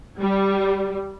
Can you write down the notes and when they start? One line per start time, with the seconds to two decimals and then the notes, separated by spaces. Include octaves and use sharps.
0.20 G3